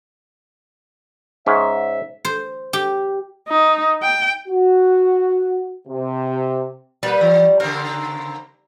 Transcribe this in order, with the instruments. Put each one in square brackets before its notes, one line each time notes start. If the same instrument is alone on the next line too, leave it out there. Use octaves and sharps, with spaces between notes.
[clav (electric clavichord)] G#2 C#4 [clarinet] E5
[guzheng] C5
G4
[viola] D#4
G5
[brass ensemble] F#4
C3
[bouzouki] G3 [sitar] A#3 B4
[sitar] E3
[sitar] C#3 A#3 C4 [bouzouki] A#4